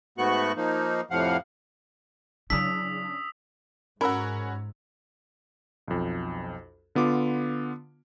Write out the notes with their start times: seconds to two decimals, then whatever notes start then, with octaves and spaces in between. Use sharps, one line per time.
0.18 G#2 A3 B3 F#4 C#6 F#6
0.57 F3 A#3 D#4
1.11 F2 A2 C3 F3 F5 F#5
2.50 C#3 F#3 D4 E4 D#6 E6 B6
4.01 G#2 C#4 F#4 A#4 B5 E6
5.88 B1 F2
6.95 D3 B3 F4 D6